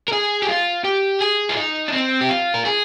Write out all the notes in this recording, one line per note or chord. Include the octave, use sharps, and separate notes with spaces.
A#4
G#4
G4
F4
G4
G#4
F4
D#4
D4
C4
G4
F4
A#4
G#4